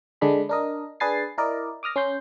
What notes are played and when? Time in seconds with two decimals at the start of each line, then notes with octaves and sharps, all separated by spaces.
0.21 D3 G#3 D4 G#4 B5
0.49 D4 A#4 D#5
1.00 D4 G#4 B4 G#5 A6 C7
1.38 E4 A#4 D5 D#5
1.83 D6 D#6 F6 A#6
1.96 C#4 C6 G6